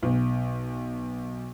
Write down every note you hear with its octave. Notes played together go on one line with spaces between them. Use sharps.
B1